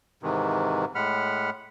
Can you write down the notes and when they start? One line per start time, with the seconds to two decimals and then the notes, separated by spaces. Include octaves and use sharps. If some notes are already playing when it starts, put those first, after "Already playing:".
0.23 G#2 C3 D#3 E3
0.95 A2 G#3 F#5 B5 F6